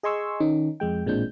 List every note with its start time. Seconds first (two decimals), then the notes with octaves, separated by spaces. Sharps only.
0.03 G#4 D#5 G#5 C6 C#6 E6
0.40 D#3 C#4 D#4
0.80 F2 G#3 G5
1.06 A1 A#2 G#3 C4 D4 G6